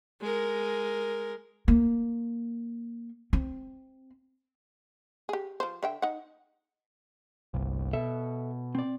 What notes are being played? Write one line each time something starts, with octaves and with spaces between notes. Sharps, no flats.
G#3 A#4
A#3
C4
G4 G#4
F3 C5
D3 E5 G5
D#4 F#5
G1 C2
B2 A4 E5
C4 D5